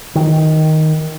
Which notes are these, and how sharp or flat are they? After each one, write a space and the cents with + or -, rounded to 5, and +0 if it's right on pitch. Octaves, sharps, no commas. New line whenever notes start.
D#3 +5